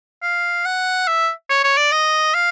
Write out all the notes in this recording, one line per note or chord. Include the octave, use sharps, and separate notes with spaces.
F5
F#5
E5
C#5
C#5
D5
D#5
F5